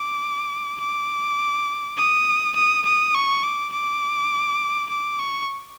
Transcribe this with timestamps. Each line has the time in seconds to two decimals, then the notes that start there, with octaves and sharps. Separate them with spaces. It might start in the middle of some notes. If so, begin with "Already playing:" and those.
Already playing: D6
0.80 D6
1.97 D#6
2.55 D#6
2.85 D#6
3.14 C#6
3.43 D6
3.72 D6
4.89 D6
5.19 C#6